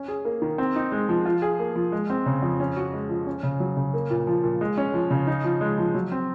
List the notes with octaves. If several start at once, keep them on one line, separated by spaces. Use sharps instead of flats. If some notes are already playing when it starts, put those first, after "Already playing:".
Already playing: C#4
G#4
A#3
D#3
C4
D#4
G#3
F3
F4
G#4
A#3
F3
G#3
C4
C#3
F2
C#4
F#4
G#3
F3
C#4
C#3
F#3
C#3
A#3
A#2
F3
A#2
G#3
C#4
F3
C#3
D#4
F3
G#3
F3
F#3
C4